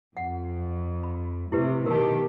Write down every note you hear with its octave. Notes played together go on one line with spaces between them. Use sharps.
F2 F#5
B5
A2 C3 E4 G4 B4
B2 D#3 G4 A#4 A5